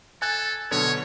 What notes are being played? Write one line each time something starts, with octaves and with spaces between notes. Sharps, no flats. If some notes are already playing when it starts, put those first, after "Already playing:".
A4 G#5 F#6 G#6
B2 D3 F#3 C#5